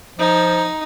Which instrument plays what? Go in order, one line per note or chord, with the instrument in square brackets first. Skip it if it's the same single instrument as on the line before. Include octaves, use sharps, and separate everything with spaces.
[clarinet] F3 [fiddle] D#4